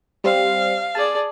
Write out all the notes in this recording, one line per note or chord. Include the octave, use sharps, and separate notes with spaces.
G3 C4 F5
G#4 D5 A5